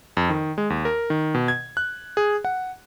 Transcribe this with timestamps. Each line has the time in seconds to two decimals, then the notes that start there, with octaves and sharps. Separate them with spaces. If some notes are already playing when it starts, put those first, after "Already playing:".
0.17 F2
0.29 D#3
0.58 G#3
0.70 D#2
0.85 A#4
1.10 D#3
1.34 B2
1.48 G#6
1.77 F#6
2.17 G#4
2.45 F#5